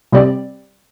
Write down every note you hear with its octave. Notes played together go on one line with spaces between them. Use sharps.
C3 G3 C4 G4 D5